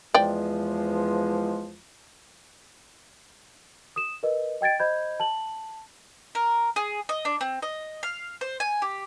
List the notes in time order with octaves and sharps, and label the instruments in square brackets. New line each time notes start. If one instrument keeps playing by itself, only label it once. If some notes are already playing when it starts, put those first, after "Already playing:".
[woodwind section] E2 F3 G#3 [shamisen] D5 G5
[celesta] D#6 E7
A#4 B4 D#5
D#5 G5 G#6 A6 D7
C5 D#5 B5 G6 G#6
A5 F#7
[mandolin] A#4
G#4
D#5
D4
C4
D#5
F5
C5
G#5
G4